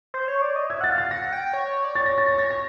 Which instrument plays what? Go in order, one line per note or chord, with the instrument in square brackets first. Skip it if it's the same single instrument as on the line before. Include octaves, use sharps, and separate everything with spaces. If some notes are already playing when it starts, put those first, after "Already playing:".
[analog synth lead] C5
C#5
D5
D#5
[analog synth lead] E5 [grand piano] G#6
[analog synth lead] F#5 [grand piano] A6
[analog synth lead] F5
[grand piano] A6
[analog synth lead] F#5 [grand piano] A#6
[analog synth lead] G5
C#5
D5
[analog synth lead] C#5 [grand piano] A6
[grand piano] A#6
A6
A#6
[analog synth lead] C#5 [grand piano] A6
[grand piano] A#6